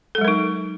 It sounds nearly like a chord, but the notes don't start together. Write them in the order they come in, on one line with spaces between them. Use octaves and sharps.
A4 G#3 F#3 A#4 D#4